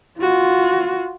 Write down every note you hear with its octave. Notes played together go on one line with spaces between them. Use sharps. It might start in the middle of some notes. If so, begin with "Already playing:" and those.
F4 F#4